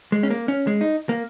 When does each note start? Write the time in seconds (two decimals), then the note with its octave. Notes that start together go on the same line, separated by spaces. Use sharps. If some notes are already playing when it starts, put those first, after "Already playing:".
0.12 G#3
0.23 C#4
0.30 A#3
0.48 C#4
0.67 G#3
0.81 D#4
1.09 A#3